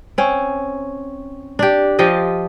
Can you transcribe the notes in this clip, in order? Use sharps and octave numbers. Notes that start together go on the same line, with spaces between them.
C4 C#4
D4 G4
F3 F4 G4 D#5